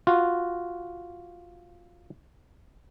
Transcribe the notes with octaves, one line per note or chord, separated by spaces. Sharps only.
F4 F#4